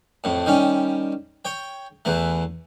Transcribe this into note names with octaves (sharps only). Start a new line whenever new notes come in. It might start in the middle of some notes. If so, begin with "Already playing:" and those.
F2 A2
D#3 G3 C#4
C#5 G5
E2 E3 A3